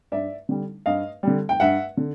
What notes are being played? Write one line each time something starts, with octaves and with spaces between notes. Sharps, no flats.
G2 D5 E5
D3 G3
G2 D#5 F5
D3 G3
G5
G2 E5 F#5
D3